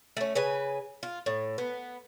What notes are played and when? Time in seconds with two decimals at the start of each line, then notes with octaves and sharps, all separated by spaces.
0.17 A3 C#4
0.35 C#3 B4 G#5
1.03 F4
1.26 A2
1.58 B3